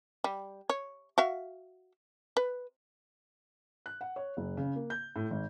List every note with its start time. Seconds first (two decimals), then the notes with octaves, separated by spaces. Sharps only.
0.24 G3
0.70 C#5
1.18 F#4 E5 F5
2.37 B4
3.86 F#6
4.01 F#5
4.16 C#5
4.37 F#1
4.57 C#3
4.76 A#3
4.90 G6
5.16 A2
5.31 G#1